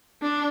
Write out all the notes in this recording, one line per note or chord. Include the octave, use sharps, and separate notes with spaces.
D4